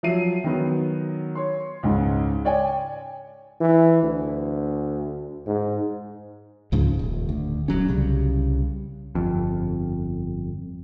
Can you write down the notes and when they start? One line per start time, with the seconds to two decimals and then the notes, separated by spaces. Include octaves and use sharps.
0.03 F3 F#3 E5 C7 D#7
0.44 D#3 F#3 B3
1.35 C#5 C6
1.83 C#2 G#2 C#3
2.45 C#5 D5 G5 G#5
3.61 E3
4.03 D2
5.46 G#2
6.72 C#2 G#2 C#3 F3
6.99 D#1
7.29 D2
7.68 D#1 G#1 F#3 C#4
7.88 C2 C#3 G3
9.15 G1 F2